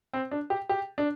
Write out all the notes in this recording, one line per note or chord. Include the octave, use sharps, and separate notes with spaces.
C4
D4
G4
G4
D4